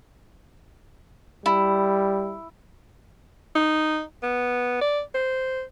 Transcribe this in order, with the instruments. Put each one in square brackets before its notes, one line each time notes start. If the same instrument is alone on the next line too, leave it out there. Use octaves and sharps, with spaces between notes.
[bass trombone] G3 [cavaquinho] E4
[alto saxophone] D#4
B3
D5
C5